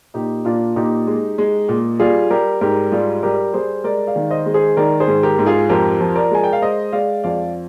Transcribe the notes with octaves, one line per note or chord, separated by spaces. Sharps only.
A#2 D#4 G4
A#2 D4 F4
A#2 D#4 G4
G#3
G#3
A#2
G3 F4 G#4
G3 G4 A#4
G#2 G4 A#4
G3 F4 G#4
G3 G4 A#4
G3 G#4 C5
G#3 A#4 D5
D5 F5
D#3
C5 D#5
G#3
G#4 C5
D#3 A#4 D5
G#4 C5
G#2
G4 A#4
G#2
F4 G#4
F2 G4 A#4
F3
A#4 D5
G#3 G#5
G5
F5
G#3 C5 D#5
G#3 D5 F5
F2 D5 F5